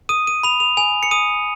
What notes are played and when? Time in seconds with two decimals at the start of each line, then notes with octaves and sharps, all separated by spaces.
0.09 D#6 D#7
0.27 D#7
0.43 B5 F7
0.60 F7
0.77 G#5 F7
1.03 C#7
1.11 D#6 D#7